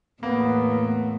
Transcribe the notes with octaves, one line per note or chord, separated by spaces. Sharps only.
E2 A2 A#3 B3